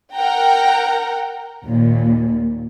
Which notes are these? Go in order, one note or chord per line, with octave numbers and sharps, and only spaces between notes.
A#4 F#5 G5 A#5
D#2 A#2